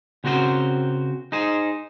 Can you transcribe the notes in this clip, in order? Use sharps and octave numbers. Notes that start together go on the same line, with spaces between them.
C#3 C4 F#4 A#4 C5
D#4 G#4 C5